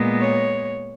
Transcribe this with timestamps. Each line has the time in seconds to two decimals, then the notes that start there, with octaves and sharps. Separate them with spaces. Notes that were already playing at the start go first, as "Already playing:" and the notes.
Already playing: A#2 G#3 B3
0.21 C#5